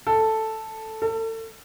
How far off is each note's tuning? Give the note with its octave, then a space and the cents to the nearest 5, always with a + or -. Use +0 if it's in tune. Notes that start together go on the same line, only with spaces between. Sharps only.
A4 +0
A4 +35